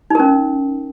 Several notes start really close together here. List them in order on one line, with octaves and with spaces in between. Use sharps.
D#4 A#4 C#4